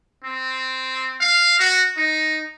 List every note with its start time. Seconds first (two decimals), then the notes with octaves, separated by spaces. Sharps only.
0.25 C4
1.20 F5
1.59 F#4
1.97 D#4